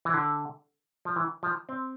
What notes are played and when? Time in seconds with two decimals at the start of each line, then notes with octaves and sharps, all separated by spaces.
0.05 E3
0.14 D3
1.05 F3
1.16 E3
1.43 F3
1.69 C4